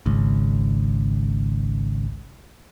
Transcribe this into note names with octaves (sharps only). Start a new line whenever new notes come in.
G#1 C#2